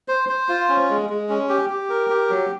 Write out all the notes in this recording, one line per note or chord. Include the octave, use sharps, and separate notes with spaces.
C5
C5
F4
C#4
G#3
G#3
C#4
G4
G4
A#4
G4
F#3